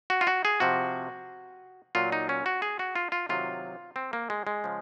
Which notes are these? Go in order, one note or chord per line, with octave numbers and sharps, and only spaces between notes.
F#4
F4
F#4
G#4
C3 F3 F#4
A#2 F#3 F4
D#4
C#4
F#4
G#4
F#4
F4
F4
C3 D#3 F#3 F4
C4
A#3
G#3
G#3
C#3 F3